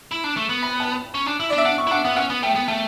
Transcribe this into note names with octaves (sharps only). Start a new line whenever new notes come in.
E4
D4
A3
B3
B5
A5
C#4
D4
E4
D5
D4
E5
D4 F#5
C#6
E4
D4 F#5
B3 F#5
C#4 F#5
B3
A3 G5
B3
A3 A5